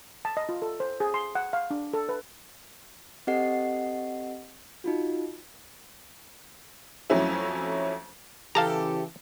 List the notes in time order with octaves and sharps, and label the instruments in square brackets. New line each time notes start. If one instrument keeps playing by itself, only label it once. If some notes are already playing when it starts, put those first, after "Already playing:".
[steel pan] A5
D#5
F4
A4
C5
G#4
C6
F#5
F5
D4
A4
B4
[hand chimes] C4 G4 A4 D#5 F#5 C7
D#4 F4 F#4
[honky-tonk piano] F2 F#3 A3 C#4 E4
[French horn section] C#3 E3 [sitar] G4 A4 [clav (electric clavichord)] F5 A5 A#5